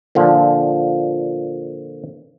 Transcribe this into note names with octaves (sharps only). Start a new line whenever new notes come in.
A#2 D3 F3